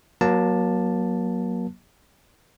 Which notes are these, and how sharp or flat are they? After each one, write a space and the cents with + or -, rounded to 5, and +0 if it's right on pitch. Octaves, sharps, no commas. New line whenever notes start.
F#3 +0 A#3 +30 A5 +0